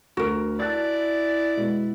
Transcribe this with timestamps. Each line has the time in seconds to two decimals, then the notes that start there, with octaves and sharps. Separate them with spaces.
0.17 D2 F#4 A#4
0.60 E4 D5 A5 F#6 A6
1.56 B2 G#3 B3